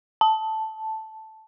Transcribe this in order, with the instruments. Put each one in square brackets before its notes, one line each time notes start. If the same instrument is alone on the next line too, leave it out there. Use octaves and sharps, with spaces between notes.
[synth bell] A5